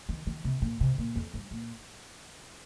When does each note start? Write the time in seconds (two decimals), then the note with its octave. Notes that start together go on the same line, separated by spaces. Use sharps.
0.09 D#3
0.27 D#3
0.45 C3
0.62 A#2
0.81 C3
0.98 A#2
1.16 F2
1.34 G2
1.51 A#2